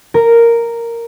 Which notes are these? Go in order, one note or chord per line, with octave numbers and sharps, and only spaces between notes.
A#4